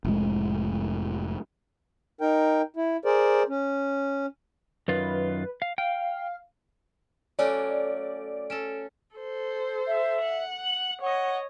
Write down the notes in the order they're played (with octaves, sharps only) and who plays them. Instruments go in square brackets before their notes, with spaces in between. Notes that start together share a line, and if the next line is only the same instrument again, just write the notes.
[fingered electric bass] F1 A2 G#3
[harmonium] D#4 A#4 G5
E4
G#4 A#4 C5 D5
C#4
[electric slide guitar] F#2 D#3 F4 [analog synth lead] B4
[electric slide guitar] F5
[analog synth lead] F5 [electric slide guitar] G5
[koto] F#3 A3 C#4 [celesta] C#5 G#5 [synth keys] D5
[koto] C#4 A4 [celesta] D7 E7
[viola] A4 C5
[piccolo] E5
[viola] F#5
[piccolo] F#7
[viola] C#5 D#5 [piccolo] F#5